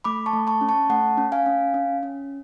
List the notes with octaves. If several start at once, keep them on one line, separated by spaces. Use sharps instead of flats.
A3 B5 D6
A5 C#6
A3
A5 C#6
C#4
A5 C#6
A3 F#5 A5
C#4
F5 G#5
C#4
C#4
C#4